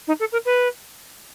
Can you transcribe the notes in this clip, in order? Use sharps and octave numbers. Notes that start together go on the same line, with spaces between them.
D#4
A4
A#4
B4